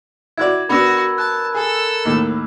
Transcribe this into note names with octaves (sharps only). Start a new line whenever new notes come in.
E4 F#4 D5 G#6
B3 D4 F#4 A#4 B5 E6
A5 F#6
G#4 A4 E6
D#2 A2